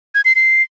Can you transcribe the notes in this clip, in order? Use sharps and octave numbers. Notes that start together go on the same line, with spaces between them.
G#6
C7
C7